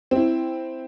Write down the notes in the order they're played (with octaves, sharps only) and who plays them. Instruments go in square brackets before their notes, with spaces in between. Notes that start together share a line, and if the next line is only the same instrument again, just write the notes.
[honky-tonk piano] C4 E4